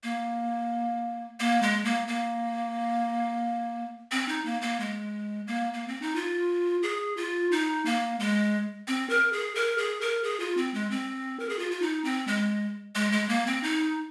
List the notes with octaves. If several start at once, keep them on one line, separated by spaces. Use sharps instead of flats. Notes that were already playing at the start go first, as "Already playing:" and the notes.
A#3
A#3
G#3
A#3
A#3
C4
D#4
A#3
A#3
G#3
A#3
A#3
C4
D#4
F4
G#4
F4
D#4
A#3
G#3
C4
A#4
G#4
A#4
G#4
A#4
G#4
F4
C4
G#3
C4
A#4
G#4
F4
F4
D#4
C4
G#3
G#3
G#3
A#3
C4
D#4